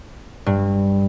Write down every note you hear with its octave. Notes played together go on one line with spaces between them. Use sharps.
G2